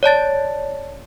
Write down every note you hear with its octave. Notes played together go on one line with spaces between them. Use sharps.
C#5 D5 A5 A6